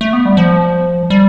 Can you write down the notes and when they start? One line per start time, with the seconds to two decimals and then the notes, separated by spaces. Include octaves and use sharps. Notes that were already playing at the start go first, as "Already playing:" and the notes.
0.01 A3
0.13 B3
0.25 G3
0.37 F3
1.10 G3